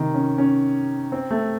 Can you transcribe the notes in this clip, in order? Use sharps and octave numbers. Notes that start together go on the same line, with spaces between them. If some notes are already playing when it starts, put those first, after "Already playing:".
Already playing: C3 D#3
C#4
C#4
C4
A3